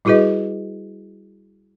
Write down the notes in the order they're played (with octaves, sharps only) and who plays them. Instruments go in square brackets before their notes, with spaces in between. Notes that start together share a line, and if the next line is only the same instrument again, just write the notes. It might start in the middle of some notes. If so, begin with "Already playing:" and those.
[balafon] G3 E4 F#4 G#4 B4 D#5